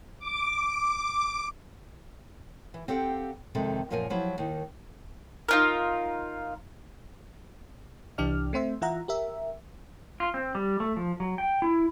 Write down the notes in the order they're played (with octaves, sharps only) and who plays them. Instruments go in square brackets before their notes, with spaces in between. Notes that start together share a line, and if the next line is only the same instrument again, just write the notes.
[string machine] D6
[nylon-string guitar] E3
C4 G4 A4 F5 F#5
F2 C3 D#3 G#3 A4
F#2 A#2 F3 A#4 F#5 G#5
F3 F#3 E4 G4 B4
D#2 D#3
[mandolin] D#4 F4 A#4
[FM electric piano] C2 E3 D4 G4 D5 F6
A3 C4 C5 E5
E3 F4 E5 F#5 A#5
G4 A#4 E5
[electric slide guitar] F4
C4
G3
A3
F3
F#3
G5
E4